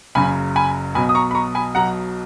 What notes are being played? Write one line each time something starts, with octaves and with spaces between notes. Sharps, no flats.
F#1 F#2 C#3 G#5 B5
G#5 B5
B1 B2 F#3 G#5 B5
D#6
A#5 C#6
B5
A#5 C#6
G#5 B5
B1 B2 F#3 F#5 A#5